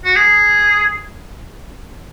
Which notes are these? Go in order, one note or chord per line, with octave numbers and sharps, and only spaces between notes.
F#4
G#4